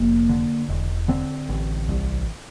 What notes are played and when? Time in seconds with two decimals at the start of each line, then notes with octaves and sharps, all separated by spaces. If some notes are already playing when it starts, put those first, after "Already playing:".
Already playing: F1 A#3
0.29 D3
0.69 E1
1.08 D3 C4
1.49 A1
1.88 C2